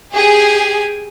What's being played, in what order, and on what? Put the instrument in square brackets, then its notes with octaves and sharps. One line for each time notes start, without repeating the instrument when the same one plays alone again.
[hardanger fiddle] G4 G#5 [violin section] G#4